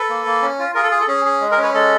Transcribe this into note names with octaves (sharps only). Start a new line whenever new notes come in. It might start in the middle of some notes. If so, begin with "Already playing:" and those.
Already playing: A4 B4
A#3
A#3
C#4
F4
F4 G#4 A#4
A4
G#4
A4
C#4 G#4
G#4
G#3
G#4 A#4
C#4
B4 C#5
G#3 A4